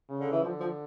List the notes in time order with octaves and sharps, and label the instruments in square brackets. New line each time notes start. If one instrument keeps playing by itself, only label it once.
[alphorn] C#3
[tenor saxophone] D3
E3
[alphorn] D3 [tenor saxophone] F3
[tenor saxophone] F3